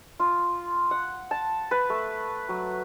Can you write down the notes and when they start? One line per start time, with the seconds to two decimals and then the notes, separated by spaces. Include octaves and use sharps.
0.20 F4
0.91 F#5
1.31 A5
1.71 B4
1.90 A3
2.49 F#3